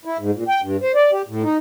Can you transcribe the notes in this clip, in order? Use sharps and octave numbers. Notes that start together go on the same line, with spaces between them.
E4
G#2
A#2
G5
G2
C5
D5
G4
A2
D#4